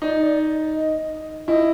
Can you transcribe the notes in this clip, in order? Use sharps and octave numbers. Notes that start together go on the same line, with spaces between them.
D#4 D5
D#5
D5
D#5
E4 D#5